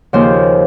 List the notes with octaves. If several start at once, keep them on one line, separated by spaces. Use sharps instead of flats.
D#2 C#3 F3 C5